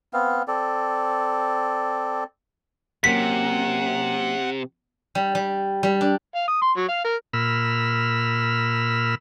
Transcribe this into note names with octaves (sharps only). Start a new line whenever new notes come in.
B3 C4 F5
C4 A4 D5
C3 F#3 A#3 C#4 F#5 B6
G3
G3
G3
D4
F5
D#6
C6
F#3
F5
A#4
A#2 B5 E6 F6